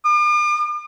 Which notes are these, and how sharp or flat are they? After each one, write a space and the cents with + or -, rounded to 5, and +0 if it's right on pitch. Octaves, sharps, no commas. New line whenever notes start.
D6 +45